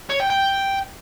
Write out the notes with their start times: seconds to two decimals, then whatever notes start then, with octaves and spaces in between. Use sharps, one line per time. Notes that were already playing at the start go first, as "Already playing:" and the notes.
0.10 C#5
0.20 G5
0.30 G5